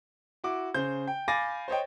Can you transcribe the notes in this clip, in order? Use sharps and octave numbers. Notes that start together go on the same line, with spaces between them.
E4 F#4 D6
C#3 C5 G6
G5
F5 G#5 B5 D6 A6 A#6
C5 C#5 D#5 G5